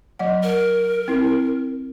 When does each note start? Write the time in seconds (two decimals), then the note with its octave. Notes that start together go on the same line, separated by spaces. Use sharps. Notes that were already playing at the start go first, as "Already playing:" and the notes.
0.19 F#3 D#5 F#5
0.43 A#4
1.08 C4 E4